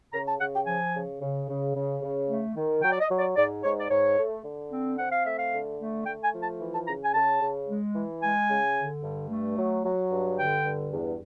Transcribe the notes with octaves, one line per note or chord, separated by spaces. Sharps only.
C#3 A#5
A5
C#3 F#5
G5
F3 G#5
C#3
C#3
C#3
C#3
C#3
A3
D#3
F#3 G5
D5
D#5
F#3
D5
G#2 D5
G#2 C#5
D5
G#2 C#5
A3
D3
C4
C4 F#5
F5
A3 E5
F5
D3
A3
A3 G5
G#5
F3
A5
E3
A5
C#3 A#5
G#5
C#3 A5
C#3
G#3
E3
G#3 G#5
C#3
D3
G2
A3
F#3
F#3
G2
D3 G5
G2
E2